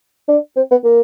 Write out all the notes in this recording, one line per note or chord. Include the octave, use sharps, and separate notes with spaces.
D4
C4
B3
A#3